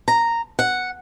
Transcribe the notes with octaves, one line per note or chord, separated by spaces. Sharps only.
A#5
F#5